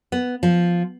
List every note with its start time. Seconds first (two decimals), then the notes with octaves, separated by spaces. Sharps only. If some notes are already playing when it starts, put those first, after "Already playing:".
0.12 B3
0.43 F3